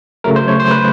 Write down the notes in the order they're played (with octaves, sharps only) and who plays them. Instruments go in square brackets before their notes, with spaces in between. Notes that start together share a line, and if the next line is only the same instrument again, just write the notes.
[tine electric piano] C#3 F#3 A3 A#4
C5
C#5
C5
B4